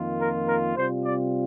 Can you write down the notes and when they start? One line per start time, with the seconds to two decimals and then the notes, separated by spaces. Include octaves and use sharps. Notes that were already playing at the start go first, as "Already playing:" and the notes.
Already playing: F2 D#3 A#3 F4
0.20 A#4
0.48 A#4
0.77 C3 G3 C4 F4 C5
1.04 D5